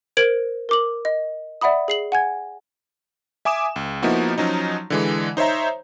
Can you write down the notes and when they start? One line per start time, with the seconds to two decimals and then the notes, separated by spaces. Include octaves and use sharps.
0.17 A#4 C5 G#6 D7 F#7
0.69 A#4 D6 F#7
1.05 D#5
1.61 D5 E5 F#5 B5 D#6
1.88 G#4 C7 F#7
2.12 F#5 G#5 G#6
3.45 E5 G#5 D6 D#6 E7
3.76 C#2
4.03 F3 A#3 B3 D#4 E4 F#4
4.38 F3 F#3 C#4 D#4
4.90 D3 E3 G#3
5.37 D#4 C5 C#5 E5 A#5